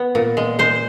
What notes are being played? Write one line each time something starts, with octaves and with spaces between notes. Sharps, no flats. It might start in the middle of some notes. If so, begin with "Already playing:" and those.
Already playing: B3
A#2
G#3
G#3 C5